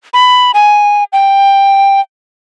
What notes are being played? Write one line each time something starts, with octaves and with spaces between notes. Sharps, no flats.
B5
G#5
G5